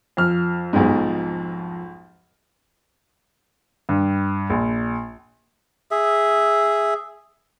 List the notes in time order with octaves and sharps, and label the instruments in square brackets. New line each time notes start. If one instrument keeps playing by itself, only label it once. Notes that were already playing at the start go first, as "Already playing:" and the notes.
[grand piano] F2 F6
[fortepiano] B1 G#2
[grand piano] G2
A#1
[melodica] G#4 E5